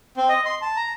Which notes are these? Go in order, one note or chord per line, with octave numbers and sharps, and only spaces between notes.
C4
D#5
C6
A5
A#5